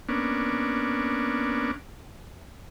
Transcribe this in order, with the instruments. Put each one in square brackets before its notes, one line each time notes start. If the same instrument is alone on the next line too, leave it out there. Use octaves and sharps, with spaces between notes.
[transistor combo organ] A#3 B3 C#4 D4